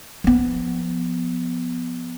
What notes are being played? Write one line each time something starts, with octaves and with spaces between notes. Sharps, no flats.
F3 B3